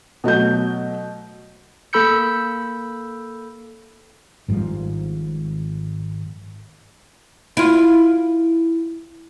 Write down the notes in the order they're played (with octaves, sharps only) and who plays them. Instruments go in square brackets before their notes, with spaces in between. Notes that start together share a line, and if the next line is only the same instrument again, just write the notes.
[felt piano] B2 F#3 A3 G6
[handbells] A#3 A4 B5 E6 G6 C#7
[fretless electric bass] G#1 G#2 F3 G3
[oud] E4 F4